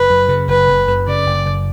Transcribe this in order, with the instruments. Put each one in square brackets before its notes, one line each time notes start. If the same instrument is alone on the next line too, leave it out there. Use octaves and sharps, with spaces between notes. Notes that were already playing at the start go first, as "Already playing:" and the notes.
Already playing: [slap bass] F#1 [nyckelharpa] B4
[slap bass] F#2
C#3
[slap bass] F#1 [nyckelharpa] B4
[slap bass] F#1
F#2
[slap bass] C#3 [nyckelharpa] D5
[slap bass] F#1
F#1